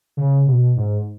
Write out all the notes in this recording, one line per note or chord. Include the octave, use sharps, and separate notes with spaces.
C#3
B2
G#2